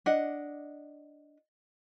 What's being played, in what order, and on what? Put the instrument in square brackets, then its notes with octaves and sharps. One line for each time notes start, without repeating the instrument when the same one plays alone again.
[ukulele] D4 D#5 F#5